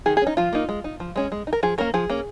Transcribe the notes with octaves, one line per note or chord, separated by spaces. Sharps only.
D#3 G#4
G#4
C#4 D#4
F3 F4
A#3 D#4
G#3
D#4
F3
G#3 C#4
G#3
D#4
A#4
F3 G#4
A#3 C#4 A#4
F3 G#4
A#3 C#4